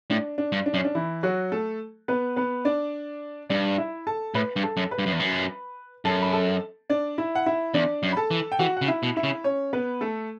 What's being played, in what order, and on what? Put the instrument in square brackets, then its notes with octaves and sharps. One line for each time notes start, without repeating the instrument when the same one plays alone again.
[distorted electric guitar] A2 [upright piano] D4
[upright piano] D4
[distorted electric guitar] G2
[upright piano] D4
[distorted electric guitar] F#2 [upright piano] C#4
[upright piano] D4
E3 E4
F#3 F#4
A3 A4
B3 B4
B3 B4
D4 D5
[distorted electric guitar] G2 [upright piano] D4 D5
[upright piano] E4 E5
A4 A5
[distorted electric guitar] A2 [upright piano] B4 B5
[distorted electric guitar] G2
[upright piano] A4 A5
[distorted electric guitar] F#2
[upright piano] B4 B5
[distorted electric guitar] G2
F#2
E2
F#2
[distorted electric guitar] F#2 [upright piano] A4 A5
[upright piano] B5
A4 A5
D4 D5
E4 E5
F#5
E4 E5
[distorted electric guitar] E2 [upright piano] D4 D5
[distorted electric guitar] F#2
[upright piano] B5
A4 A5
[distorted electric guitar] E3
[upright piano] G5
[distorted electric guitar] E3 [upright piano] F#4 F#5
[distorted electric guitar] C#3 [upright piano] F#5
[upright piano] E4 E5
[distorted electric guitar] B2
[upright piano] E4 E5
[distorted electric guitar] C#3
[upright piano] C#4 C#5
B3 B4
A3 A4